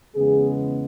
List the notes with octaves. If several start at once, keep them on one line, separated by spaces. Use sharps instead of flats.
E2 C#3 G#3 B3 G#4